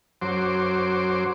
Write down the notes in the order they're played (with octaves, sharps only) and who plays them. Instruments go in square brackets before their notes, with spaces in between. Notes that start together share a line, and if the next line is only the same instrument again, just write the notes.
[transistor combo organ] F#2 F#3 C5 C6 D6